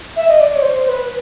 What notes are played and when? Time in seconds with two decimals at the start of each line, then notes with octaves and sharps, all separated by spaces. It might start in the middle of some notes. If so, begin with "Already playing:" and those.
0.16 E5
0.28 D#5
0.40 D5
0.56 C#5
0.62 C5
0.85 C5
0.89 B4